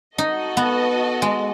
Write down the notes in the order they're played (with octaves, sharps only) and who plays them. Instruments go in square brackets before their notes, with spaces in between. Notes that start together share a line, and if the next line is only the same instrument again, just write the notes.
[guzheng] D#4 [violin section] F#4 A4 D#5
[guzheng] B3
G#3